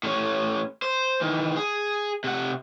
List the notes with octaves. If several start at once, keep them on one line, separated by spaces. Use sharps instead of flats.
A2 C#4
C5
D#3 E3
G#4
C3 F#5